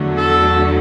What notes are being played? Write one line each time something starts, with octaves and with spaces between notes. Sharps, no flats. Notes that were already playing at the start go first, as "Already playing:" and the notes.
Already playing: E2 D3 F#3 A3
A4